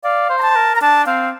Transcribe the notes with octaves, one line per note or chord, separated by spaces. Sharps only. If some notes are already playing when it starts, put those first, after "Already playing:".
D5 F5
C5
A#5
A5
C5
A#4
A#5
D4 A5
C4 F5